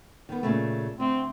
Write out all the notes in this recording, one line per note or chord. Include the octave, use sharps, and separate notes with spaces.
D#3 B3
A#2 C#3 A3
D2 C4